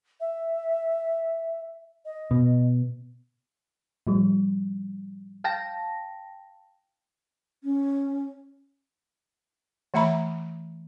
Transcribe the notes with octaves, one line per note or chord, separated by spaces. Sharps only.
E5
D#5
B2
A2 F3 G3
F5 G5 A5 A#6
C#4
E3 A3 E5 A#5 B5